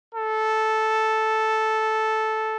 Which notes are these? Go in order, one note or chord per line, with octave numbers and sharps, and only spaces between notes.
A4